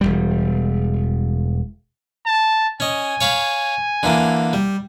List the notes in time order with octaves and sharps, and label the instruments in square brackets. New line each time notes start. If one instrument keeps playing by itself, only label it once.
[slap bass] E1 C2 G3
[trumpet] A5
[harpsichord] C#4 D#5 [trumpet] G#5
[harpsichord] C#5 F5 B5
D3 E3 A#3
G3